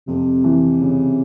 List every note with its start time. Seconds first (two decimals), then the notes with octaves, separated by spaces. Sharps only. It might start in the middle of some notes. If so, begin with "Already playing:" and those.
0.08 F2 C3
0.44 E3
0.81 C#3